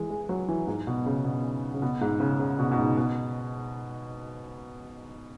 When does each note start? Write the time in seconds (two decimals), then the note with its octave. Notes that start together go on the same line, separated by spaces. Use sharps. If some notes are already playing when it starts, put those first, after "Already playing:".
Already playing: E3 G#3
0.10 G#3
0.29 F#3
0.48 E3
0.67 G#2
0.87 B2
1.06 C#3
1.25 B2
1.74 C#3
1.82 B2
2.01 G#2
2.20 C#3
2.39 C#3
2.59 B2
2.71 B2
2.78 G#2
2.97 B2